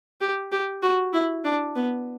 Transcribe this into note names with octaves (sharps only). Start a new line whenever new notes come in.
G4
G4
F#4
E4
D4
B3